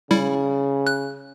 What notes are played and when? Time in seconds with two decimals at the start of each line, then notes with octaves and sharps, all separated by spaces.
0.11 C#3 G3 E4
0.87 F#6